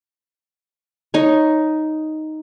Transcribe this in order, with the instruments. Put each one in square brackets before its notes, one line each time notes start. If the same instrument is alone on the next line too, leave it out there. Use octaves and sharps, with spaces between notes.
[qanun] D#4 C#5